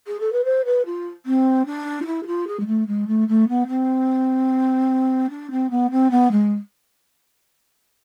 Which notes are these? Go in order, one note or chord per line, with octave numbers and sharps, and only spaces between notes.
G#4
A4
B4
C5
B4
F4
C4
D4
F4
E4
G#4
F4
G#4
G#3
A3
G#3
A3
A3
B3
C4
D4
C4
B3
C4
B3
G#3